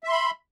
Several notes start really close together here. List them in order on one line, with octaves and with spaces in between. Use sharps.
E5 C6 B5